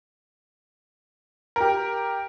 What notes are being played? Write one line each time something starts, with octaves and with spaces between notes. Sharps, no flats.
G4 A#4